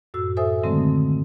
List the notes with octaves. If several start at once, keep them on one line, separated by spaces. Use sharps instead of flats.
F#2 A2 F#4 E6
A4 C5 E5 G#5 D#6
D3 D#3 F#3 G#3 A3 C4